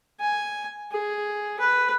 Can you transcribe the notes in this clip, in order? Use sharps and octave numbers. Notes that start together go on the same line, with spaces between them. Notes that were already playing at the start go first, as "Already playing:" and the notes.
G#5
G#4
B4